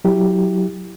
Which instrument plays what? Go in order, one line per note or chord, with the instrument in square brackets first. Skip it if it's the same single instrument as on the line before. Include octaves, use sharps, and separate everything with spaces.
[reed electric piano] F#3 E4 G4